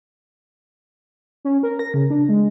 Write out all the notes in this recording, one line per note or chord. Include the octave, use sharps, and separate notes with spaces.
C#4
A#4
A#6
C#3
D4
G#3